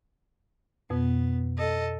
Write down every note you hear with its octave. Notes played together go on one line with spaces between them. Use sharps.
F2 B2 B3
A4 D#5